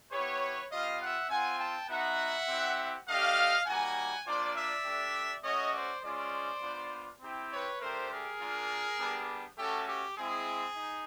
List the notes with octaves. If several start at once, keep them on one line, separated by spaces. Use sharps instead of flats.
B3 E4 G4 B4 C#5
G3 C4 F4 D#5 F5
E5 F#5
C4 F4 F#5 G#5
G5 A5
B3 D#4 F#4 E5 F#5
C4 E4 G4
A3 D4 G4 D#5 F5
G3 A#3 D#4 F#4 F#5 G#5
A#3 D4 F4 C5 D5
D5 E5
A3 D4 G4
A3 C#4 F#4 C#5 D#5
C5 D5
G#3 C#4 F4 C5 D5
B3 D4 F4
C4 E4 G4
B4 C#5
A3 D4 G4 A#4 C5
G#4 A#4
A#3 D4 F4
G3 B3 D4 G4
A3 C#4 F#4 G4 A4
G4
G#3 C4 E4 G#4
D#4